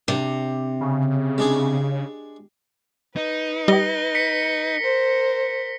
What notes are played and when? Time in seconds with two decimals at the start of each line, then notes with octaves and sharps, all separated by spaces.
0.08 C3 D4
0.81 C#3
1.38 G#3 D4 G#4
3.16 D#4 B4
3.68 G3 G4 D#5 A#6 G7
4.15 B6 C#7
4.81 A#4 C5